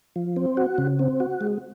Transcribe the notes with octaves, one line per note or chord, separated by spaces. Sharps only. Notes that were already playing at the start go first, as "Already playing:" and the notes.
F3
C4
F#4
C#3
C4
F#4
G#3